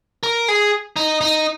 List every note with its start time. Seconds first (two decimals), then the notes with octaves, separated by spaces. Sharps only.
0.23 A#4
0.48 G#4
0.96 D#4
1.21 D#4